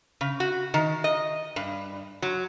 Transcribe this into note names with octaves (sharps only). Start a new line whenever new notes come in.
C#3
F#4
D#3
D#5
G2
F#3